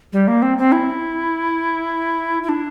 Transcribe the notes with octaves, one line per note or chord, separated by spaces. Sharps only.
G3
A#3
C4
C4
E4
E4
D4